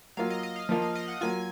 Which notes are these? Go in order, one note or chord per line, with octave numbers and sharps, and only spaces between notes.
F#3 A#3 F4 F5
D#5
D#5
F5
F3 A#3 F4
F5
D#5
F#5
F#3 A#3 F4 G#5